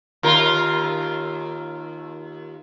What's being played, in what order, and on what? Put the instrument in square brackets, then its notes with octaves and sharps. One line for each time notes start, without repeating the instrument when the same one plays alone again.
[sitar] D#2 F4 A#4